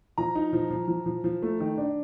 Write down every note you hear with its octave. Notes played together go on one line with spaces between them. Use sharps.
F3 A#5
D#4
F3
F3
F3
F3
F3
A3
D#3
D4